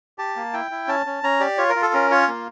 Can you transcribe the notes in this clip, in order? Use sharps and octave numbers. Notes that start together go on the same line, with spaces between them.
G4 A5
A#3
E4 G5
E4
C#4 A5
C#4
C#4 A#5
G4 D5
F4 C#5
A#4
F4
A4
C#4 A#4
F4 C#5
A#3